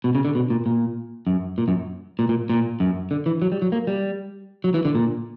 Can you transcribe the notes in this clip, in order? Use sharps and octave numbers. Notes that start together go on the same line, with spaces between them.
B2
C#3
D3
B2
A#2
A#2
F#2
A#2
F#2
A#2
A#2
A#2
F#2
D3
E3
F#3
G3
F#3
A#3
G3
F#3
E3
D3
A#2